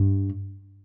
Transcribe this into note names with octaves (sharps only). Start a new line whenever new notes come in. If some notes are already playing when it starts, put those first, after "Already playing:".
Already playing: G2